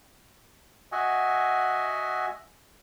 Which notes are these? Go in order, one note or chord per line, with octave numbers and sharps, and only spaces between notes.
F#4 D#5 E5 F#5 G#5